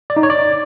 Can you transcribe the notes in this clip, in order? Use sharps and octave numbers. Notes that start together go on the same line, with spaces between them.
D5
D#4
C#5
D5